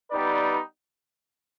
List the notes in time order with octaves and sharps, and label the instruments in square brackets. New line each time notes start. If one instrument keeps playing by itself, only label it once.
[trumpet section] G3 B3 D#4 B4 D5